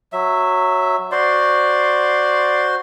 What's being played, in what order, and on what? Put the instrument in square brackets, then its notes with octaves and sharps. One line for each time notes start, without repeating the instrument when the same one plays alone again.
[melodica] F#3 E5
[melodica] F#4 C5 C6 [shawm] D5